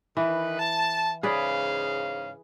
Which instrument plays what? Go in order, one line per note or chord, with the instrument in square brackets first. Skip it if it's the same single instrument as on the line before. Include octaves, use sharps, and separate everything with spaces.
[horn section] D#3 B4 [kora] E3
[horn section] A5
[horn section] G#2 C#3 F5 [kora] G#4 B4 D5